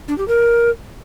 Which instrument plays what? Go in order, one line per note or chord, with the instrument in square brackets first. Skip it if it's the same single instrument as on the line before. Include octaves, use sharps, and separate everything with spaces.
[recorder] D4
G4
A#4